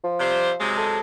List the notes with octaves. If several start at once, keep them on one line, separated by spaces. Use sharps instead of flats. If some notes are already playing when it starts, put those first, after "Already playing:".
F3
C3 G3 C5
C3 F#3 G#3
A4